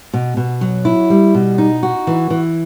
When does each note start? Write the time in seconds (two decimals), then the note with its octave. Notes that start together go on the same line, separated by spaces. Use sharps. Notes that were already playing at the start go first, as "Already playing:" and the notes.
0.13 B2
0.37 B2
0.61 F#3
0.85 E4
1.10 G3
1.34 B2
1.58 D#4
1.83 F#4
2.07 E3
2.30 E3